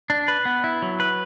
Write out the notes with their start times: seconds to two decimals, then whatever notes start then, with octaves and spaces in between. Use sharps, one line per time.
0.10 D4
0.28 B4
0.45 B3
0.64 E4
0.82 F#3
1.00 B4